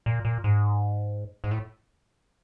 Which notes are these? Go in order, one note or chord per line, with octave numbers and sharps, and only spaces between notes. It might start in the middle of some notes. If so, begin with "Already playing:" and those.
A#2
A#2
G#2
G#2
A2